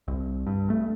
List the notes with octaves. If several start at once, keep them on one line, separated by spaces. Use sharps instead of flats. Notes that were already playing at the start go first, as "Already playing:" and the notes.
C2
G2
A3